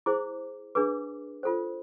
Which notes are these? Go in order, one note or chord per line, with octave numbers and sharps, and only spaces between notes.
E4 G#4 C5 D6
D4 G#4 B4 D6
F4 A4 C5